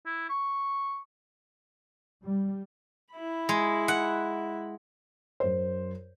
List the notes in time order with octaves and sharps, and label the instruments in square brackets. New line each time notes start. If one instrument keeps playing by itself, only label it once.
[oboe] E4
C#6
[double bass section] G3
[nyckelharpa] E4 B5
[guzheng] G#3
F#5
[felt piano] F#2 C5